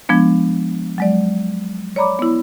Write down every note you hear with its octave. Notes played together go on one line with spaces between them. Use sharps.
F3 G#3 B3 D4
F#3 G#3 D5
C#5 D5 A#5 B5 D6
B3 E4